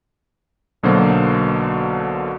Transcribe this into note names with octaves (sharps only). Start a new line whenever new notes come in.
B1 B2 D3 F#3 A#3 C5